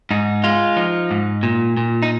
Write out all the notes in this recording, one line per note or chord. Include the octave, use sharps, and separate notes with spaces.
G#2 D#4
G#3 F4
F3 D#4
G#2
A#2
A#2
D#4